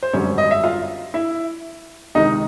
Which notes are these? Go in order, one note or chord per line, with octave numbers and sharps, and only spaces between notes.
C5
G#1 F#2 D3 G3 C#4 C#5
D#5
E5
F4 F5
E4 E5
C#2 C3 D#3 D#4 D#5